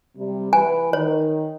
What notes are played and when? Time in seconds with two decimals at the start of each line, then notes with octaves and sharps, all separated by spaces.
0.16 C3 G3
0.53 E3 B4 G#5
0.93 D#3 C#5